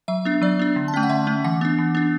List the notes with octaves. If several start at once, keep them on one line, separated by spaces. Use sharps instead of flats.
F#3 E5
B3 D4
F#3 D5
B3 D4
D3
A5
A3 C#4 G5
F#5
D3 E5
A3 C#4
E3 F#5
B3 D4
E3
B3 D4